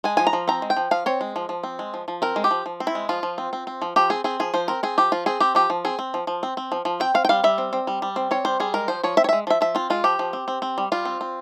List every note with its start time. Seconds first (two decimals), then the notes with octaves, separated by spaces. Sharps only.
0.04 G#3 G#5
0.17 F3 G#5
0.27 A#5
0.33 F3
0.48 C4 A#5
0.62 G#3
0.70 G5
0.77 F3
0.91 F3 F5
1.06 C4 C#5
1.21 G#3
1.36 F3
1.49 F3
1.63 C4
1.79 G#3
1.94 F3
2.08 F3
2.22 C4 A#4
2.36 G#3
2.44 G4
2.51 F3
2.66 F3
2.80 C4
2.87 E4
2.95 G#3
3.09 F3 F4
3.23 F3
3.38 C4
3.53 C4
3.67 C4
3.82 F3
3.96 F3 G4
4.10 C4 G#4
4.24 C4 G#4
4.40 F3 G#4
4.54 F3 C5
4.68 C4 A#4
4.83 C4 G#4
4.98 F3 G4
5.12 F3 F4
5.26 C4 G#4
5.40 C4 G4
5.55 F3 G4
5.70 F3
5.85 C4 G#4
5.99 C4
6.14 F3
6.27 F3
6.43 C4
6.57 C4
6.72 F3
6.85 F3
7.00 C4 G5
7.14 C4 F5
7.25 G5
7.29 G3 F5
7.44 G3 E5
7.58 C4
7.73 C4
7.87 G3
8.02 G3
8.16 C4
8.31 C4 C#5
8.45 G3 C5
8.60 G3 G#4
8.74 G#3 A#4
8.88 F3 C5
9.03 F3 C#5
9.17 C4 E5
9.24 C#5
9.29 G#3 E5
9.47 F3 E5
9.61 F3 E5
9.75 C4 F4
9.90 G#3 F4
10.04 F3 G4
10.19 F3
10.33 C4
10.48 C4
10.62 C4
10.78 G3
10.92 G3 F4
11.05 C4
11.21 C4